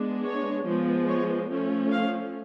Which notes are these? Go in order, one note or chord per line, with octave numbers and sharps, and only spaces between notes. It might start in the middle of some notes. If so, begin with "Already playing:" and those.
Already playing: G#3 B3 D4
C#5
F3 G#3 B3
C#5
F3 A3 C#4
F5